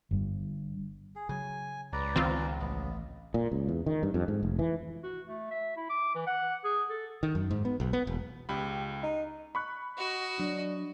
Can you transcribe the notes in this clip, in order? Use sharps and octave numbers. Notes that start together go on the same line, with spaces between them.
G1 G2
G#4
C#3 F#3 G#5
C#2 B4 D5 A#5
D#3 G#3 B3 C4 F4
A1 B3
A#2
C#2
E2
D#3
G2
F2
G#2
F1
E3
F#4
A3
E5
E4
D6
E3
F#5
G#4
A4
D#3
F#2
G#2
B3
B1
B3
E1
C#2 G4 B5
D#4
B5 C#6 F#6
F#4 D#5
F#3 D4